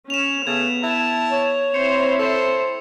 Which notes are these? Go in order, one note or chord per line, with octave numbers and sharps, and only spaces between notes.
C#4 E7 F7
C#3 A3 B3 G#6
E4 A5
C#5
C4 E4 C5 C#7
A4 C5